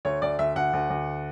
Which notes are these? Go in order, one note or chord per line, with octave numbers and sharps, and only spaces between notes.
D2 C#5
D2 D5
D2 E5
D2 F#5
D2
D2